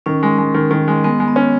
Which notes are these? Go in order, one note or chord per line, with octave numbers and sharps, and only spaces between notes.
D#3 C#4
G#3
G#3
D#3
D#3
G#3
G#3 B3
G#3
B3
C#4